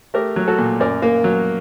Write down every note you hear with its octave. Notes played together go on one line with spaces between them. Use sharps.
A3 G4 A#4
F#3
F#4 A4
A#2
F#2 A#4 D5
A#3
F#3